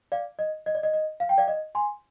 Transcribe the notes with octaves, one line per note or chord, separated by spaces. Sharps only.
D5 F5
D#5
D#5
D5
D#5
D#5
F5
G5
D5 F5
D#5
G#5 C6